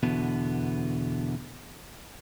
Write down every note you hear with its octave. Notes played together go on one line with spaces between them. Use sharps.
E2 B2 D3 B3